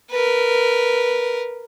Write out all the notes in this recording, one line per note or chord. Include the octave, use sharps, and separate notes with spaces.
A#4 B4